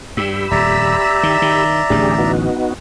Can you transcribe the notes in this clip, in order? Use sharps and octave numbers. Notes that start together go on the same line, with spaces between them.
G2 G4 B5 E6
D#1 F2 D5 E5 A#5
D#3
D#3
D1 A1 E3 D4 G4 G#4
B3 D#4 F#4